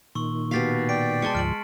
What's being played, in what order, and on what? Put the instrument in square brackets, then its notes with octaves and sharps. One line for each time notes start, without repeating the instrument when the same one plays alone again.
[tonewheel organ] A#2 D#3 [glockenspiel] C6 C#6 E6
[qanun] B2 G4 F5 [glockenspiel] A6 B6 C7
[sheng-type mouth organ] D5 G5 [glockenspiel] B6 D7
[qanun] G#3 G#5 C6 [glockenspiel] A5 C#7
[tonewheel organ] D2 G#2 F3 [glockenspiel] F6 D7 F#7